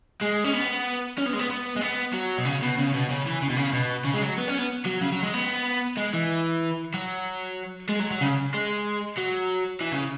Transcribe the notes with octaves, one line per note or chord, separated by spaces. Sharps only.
G#3
C#4
B3
C#4
B3
G#3
B3
B3
G#3
B3
F#3
B2
C#3
B2
C#3
B2
C#3
E3
C#3
B2
C#3
B2
C#3
G#3
F#3
B3
C#4
B3
F#3
C#3
F#3
G#3
B3
G#3
E3
F#3
G#3
F#3
F#3
C#3
G#3
F#3
E3
C#3